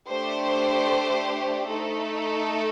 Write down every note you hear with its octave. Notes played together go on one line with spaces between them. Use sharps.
A3 D4 G4 C5
A3 D#4 A4